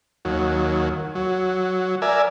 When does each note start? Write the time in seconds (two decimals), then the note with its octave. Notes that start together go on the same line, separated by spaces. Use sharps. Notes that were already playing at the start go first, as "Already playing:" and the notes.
0.25 D#2 F#3
1.15 F#3
2.02 A#4 D5 E5 G#5